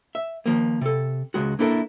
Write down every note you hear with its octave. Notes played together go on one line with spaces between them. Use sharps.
E5
D#3 F3 A#3
C3 A4
C#2 G#3 F#4
A#3 D4 E4 A4 A#4